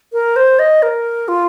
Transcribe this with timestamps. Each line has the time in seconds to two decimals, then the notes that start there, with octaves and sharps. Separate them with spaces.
0.13 A#4
0.36 C5
0.59 D#5
0.82 A#4
1.28 F4